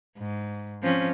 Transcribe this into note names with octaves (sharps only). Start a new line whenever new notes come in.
G#2
F3 C4 C#4